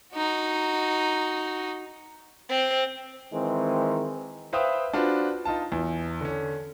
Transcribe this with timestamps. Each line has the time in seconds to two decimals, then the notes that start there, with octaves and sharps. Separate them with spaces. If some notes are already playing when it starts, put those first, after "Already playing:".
0.14 D#4 F#4
2.49 C4
3.33 D#3 E3 G#3 C4
4.53 B4 C5 E5 F5 G5 D#6
4.93 D4 F4 F#4 B4 C5
5.45 D#4 F4 A5
5.72 E2
6.21 D3 C#4